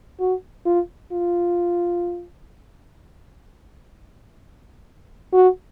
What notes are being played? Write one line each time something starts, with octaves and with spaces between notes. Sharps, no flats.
F#4
F4
F4
F#4